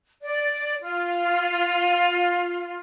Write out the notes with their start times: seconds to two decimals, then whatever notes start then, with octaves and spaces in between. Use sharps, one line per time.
0.22 D5
0.82 F4